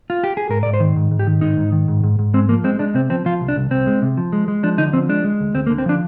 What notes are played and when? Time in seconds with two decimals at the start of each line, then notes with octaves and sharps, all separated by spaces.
0.10 F4
0.24 G4
0.37 G#4
0.49 G#2 A#4
0.63 G#2 D5
0.74 C5
0.80 D#3
0.96 G#2
1.11 G#2
1.19 G4
1.27 D#3
1.41 G#2 D#4
1.57 G#2
1.72 D#3
1.88 G#2
2.04 G#2
2.19 G#2
2.34 G#3 C4
2.49 F3 A#3
2.64 G#3 C4
2.79 G#3 D4
2.94 C3 C4
3.10 F3 C4
3.26 F3 F4
3.41 C2
3.48 D4
3.56 C2
3.71 C2 C4
3.87 G#3
4.02 C3
4.17 F3
4.33 G#3
4.48 G#3
4.63 F3 D4
4.78 D3 D#4
4.93 F3 C4
5.09 G#3 D4
5.24 G#3
5.40 D2
5.54 D2 C4
5.67 A#3
5.70 D3
5.78 C4
5.86 F3 D4